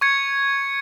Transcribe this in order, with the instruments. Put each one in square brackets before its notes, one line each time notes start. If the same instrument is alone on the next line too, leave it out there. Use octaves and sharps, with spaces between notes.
[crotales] C#6 G#6 C#7